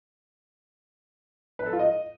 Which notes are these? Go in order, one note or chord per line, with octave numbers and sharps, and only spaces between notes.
B4
A4
F4
D#5